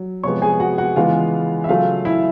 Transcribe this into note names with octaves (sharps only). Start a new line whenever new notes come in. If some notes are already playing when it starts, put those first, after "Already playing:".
Already playing: F#3
C3 F3 G#3 B3 C#5 C#6
G#4 G#5
F#4 F#5
F#4 F#5
C#3 E3 G#3 B3 F4 F5
E5
C#3 F#3 A3 F4 F5
E4 E5